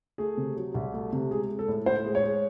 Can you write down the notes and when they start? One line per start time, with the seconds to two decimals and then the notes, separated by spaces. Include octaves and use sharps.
0.18 A3 G#4
0.37 C3
0.56 F#3
0.74 C2
0.93 A3
1.13 C3
1.31 G#3 G#4
1.50 G#3
1.59 A4
1.68 A2
1.86 A2 C5
2.05 G#3
2.15 C#5
2.24 G#3